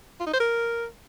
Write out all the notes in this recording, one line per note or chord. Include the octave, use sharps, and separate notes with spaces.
F4
D#4
C5
A#4